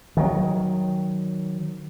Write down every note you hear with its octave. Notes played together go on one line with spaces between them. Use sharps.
D#3 F#3